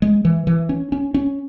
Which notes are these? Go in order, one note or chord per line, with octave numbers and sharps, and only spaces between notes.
G#3
E3
E3
C#4
C#4
C#4